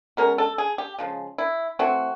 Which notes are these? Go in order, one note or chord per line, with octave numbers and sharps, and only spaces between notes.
B2 G#3 C#4 A#4
A4
G#4
G4
C#3 F3 G#3
E4
E3 A3 C4 F#4